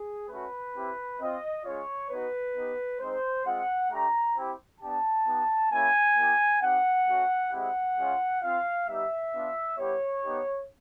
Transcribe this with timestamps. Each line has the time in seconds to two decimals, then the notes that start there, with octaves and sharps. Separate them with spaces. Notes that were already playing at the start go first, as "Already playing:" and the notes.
Already playing: G#4
0.29 A3 C#4 F#4 B4
0.74 C4 E4 G4
1.20 C4 F4 D#5
1.64 G#3 C#4 F4 C#5
2.10 B3 D#4 F#4 B4
2.56 B3 D#4 G4
3.00 G#3 C4 D#4 C5
3.45 G#3 C4 F4 F#5
3.90 A3 D4 G4 A#5
4.36 C4 E4 G4
4.81 B3 D4 G4 A5
5.26 B3 D#4 G4
5.72 A#3 C#4 E4 G4 G#5
6.17 A#3 D#4 G4
6.62 C4 D#4 G4 F#5
7.07 A3 C#4 F#4
7.51 G#3 C4 E4 G4 F#5
7.97 G#3 C#4 F4
8.42 C4 F4 F5
8.87 G3 B3 D#4 G4 E5
9.33 B3 D4 F4
9.78 G3 B3 E4 G4 C#5
10.23 B3 D#4 G4